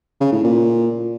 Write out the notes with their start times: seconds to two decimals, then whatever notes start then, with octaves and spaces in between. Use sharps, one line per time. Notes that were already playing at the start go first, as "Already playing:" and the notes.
0.21 C#3
0.33 A2
0.44 A#2